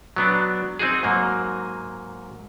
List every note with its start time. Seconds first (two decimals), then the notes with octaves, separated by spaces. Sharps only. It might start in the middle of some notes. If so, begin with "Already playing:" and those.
0.16 F#3 B3 D4
0.79 C4 D#4 F#4 G#4
1.03 G#2 F#3 A#3